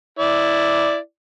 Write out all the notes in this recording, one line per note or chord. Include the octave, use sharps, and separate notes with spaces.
E4 D5